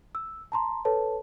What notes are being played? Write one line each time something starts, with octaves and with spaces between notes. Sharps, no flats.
E6
A5 A#5 C6
A4 B4 C#5 A5